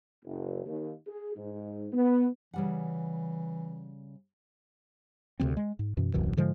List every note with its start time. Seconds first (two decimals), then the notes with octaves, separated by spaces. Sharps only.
0.25 F#1
0.66 D#2
1.07 G#4
1.36 G#2
1.93 B3
2.54 C#3 E3 G3 F#5
5.40 D2 C3 F#3 C4
5.57 G#3
5.79 G#2
5.97 F#2 B2 E3
6.14 D#1 C2 F#2 E3
6.37 G#2 D3 F3 G#3